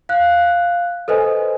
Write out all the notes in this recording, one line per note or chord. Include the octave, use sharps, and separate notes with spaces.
F5 F#6
A4 B4 C5 D#5 G#5